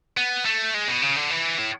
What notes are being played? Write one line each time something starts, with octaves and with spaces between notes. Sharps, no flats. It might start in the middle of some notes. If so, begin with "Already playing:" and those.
B3
A3
G#3
B2
C#3
D3
E3
A2